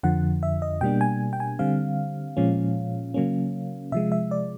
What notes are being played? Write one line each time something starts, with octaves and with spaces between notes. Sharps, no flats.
F2 D3 F3 F#5
E5
D#5
B2 G3 A#3 D4 G5
G#5
G5
G#5
D3 G3 C4 F5
A#2 F3 G#3 C#4
C#3 F#3 A#3 C#4
C3 F3 G#3 E5
E5
D5